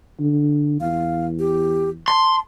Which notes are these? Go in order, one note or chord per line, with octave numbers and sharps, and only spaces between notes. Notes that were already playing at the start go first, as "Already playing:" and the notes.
D3
E2 F5
G4
A5 C6